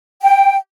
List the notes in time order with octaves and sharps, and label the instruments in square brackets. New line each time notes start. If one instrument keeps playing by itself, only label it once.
[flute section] G5